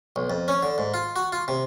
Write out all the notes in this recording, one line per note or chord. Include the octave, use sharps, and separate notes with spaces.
B1
F2
C#4
D3
G#2
F4
F#4
F4
C3